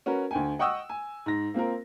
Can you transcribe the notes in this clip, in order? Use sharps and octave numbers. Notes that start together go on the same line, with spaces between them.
C#4 F#4 A#4 B4
D2 G5 G#5
D#5 F#5 G5 C#6 D#6 E6
G#5
G#2 A#6
A#3 C4 F4 A#4